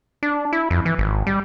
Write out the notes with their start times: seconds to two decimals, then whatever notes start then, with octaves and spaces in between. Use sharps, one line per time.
0.23 D4
0.53 E4
0.70 F2
0.85 E3
0.99 G#1
1.27 G3